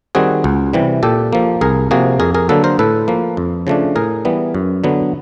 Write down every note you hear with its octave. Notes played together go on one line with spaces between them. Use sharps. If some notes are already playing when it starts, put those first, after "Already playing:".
D#3 G3 C4 F#4 G#4
C#2
C3 E3 G3
A#2 G4 A4
F3 A#3
C2 G#4 A#4
C3 F3 A#3 F#4 G#4
F2 G#4 A#4
G#4 A#4
D3 F#3 A#3 A4 B4
A#4 C5
A2 A4 B4
F3 A#3
F2
C#3 F3 A3 D4
A2 G#4 A#4
E3 G3 B3
F#2
D3 F#3 B3